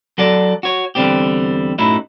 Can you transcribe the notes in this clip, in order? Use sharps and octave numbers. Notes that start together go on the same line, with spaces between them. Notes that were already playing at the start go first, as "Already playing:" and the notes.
F#3 F#4 A4 D5
F#4 C#5
E2 D3 G3 C4 G4
F#2 A2 F#3 D#4 E4